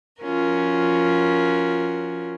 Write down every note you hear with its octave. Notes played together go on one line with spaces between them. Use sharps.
F3 C#4 F4 F#4 A#4